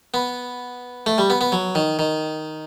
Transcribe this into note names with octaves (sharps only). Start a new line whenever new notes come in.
B3
A3
G3
B3
B3
F#3
D#3
D#3